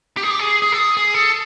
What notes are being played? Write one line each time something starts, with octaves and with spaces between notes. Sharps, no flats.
G4
G#4
G4
G#4
G#4
A4
G#4
G#4
A4